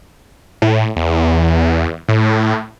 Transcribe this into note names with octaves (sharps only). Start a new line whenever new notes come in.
A2
E2
A2